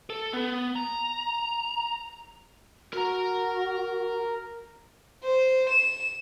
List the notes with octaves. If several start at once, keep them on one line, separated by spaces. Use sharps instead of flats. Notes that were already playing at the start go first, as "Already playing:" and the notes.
A4
B3
A#5
F#4 A#4 A#5
C5
E7